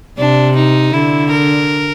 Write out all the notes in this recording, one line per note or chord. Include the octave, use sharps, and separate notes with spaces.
C3 D4
D#4
D3 E4
A#4